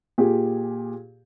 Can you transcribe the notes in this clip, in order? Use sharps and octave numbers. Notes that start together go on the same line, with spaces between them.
A#2 G4 G#4